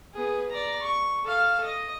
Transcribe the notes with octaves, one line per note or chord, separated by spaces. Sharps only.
B3 G#4
D5 A#5
C#6
A4 F5
D#5